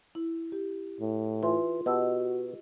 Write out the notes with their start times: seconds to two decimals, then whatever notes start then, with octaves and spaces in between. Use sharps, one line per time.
0.15 E4
0.52 G4
1.01 A2
1.43 E3 F4 C6
1.86 B2 F#4 G4 D#5 E6